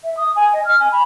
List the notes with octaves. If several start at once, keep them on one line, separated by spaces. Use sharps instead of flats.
E5
D#6
G#5
D#5
F6
G#5
B5